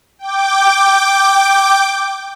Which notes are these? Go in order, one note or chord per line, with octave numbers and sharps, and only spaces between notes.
G5 D6